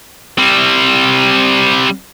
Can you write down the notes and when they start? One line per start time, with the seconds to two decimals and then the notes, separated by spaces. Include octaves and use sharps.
0.38 G3 C4